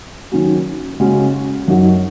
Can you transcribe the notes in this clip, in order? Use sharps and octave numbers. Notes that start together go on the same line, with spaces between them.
D#3 F#3 C#4 F#4
C#3 G#3 C#4 F#4
F#2 F#3 D#4 F#4